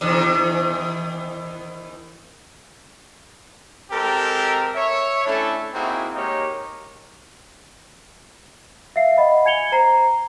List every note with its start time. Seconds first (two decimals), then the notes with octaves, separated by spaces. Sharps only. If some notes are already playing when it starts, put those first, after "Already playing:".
0.01 E2 C3 D#3
3.92 G#3 C4 G4 A4 A#4
4.75 C#5 E5 C#6
5.26 A3 C#4 D4 E4 A4
5.74 A#3 C4 D#4 E4 F#4 G#4
6.15 G#3 A#3 D#4 G4 A#4 C#5
8.96 E5 F5 C7
9.18 D#5 F#5 B5
9.45 G#5 G#6 C#7 F7 G7
9.72 C5 A#5 C7